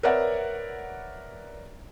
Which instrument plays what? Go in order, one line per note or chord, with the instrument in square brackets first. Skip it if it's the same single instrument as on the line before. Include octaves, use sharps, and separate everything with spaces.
[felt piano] A#4 B4 C#5 D5 E5 F#5